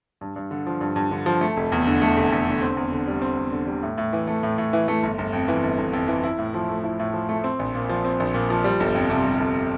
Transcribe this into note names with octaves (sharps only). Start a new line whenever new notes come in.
G2
G2
D3
F3
G2
G2
D3
F3
A3
F1
E2
D3
A3
F1
E2
D3
C4
E2
D3
G3
C4
E2
D3
G3
A2
A2
E3
A3
A2
A2
E3
A3
G1
G1
F2
E3
G1
G1
F2
E3
E4
A2
F3
A3
E4
A2
F3
A3
C4
A#1
A#2
F3
C4
A#1
A#2
F3
G3
G1
F2
C3
G3
G1